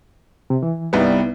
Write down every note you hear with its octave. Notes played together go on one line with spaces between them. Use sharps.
C3
E3
C2 G3 B3 D#4 B4